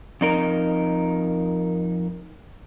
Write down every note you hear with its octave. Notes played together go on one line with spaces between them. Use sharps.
F2 D#4 A#4